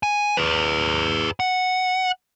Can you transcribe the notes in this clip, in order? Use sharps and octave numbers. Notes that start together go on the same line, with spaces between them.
G#5
G#4 B4
F#5